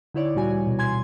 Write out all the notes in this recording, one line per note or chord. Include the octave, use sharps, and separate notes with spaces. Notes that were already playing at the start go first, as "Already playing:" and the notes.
D3 D#4 E4 C#5 D5
D2 A#2 E3 G3 F#4 G#5
B2
G#5 C6 G#6